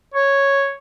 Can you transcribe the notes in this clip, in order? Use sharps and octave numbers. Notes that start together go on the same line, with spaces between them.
C#5